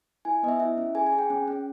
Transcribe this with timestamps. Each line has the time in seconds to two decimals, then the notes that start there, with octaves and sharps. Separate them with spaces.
0.25 E4 G#5
0.43 B3 D#5
0.48 E5
0.60 E4 E5
0.78 C#4
0.95 G#4 G#5
1.06 G#5
1.12 G#4
1.18 G5
1.30 C#4
1.48 C#4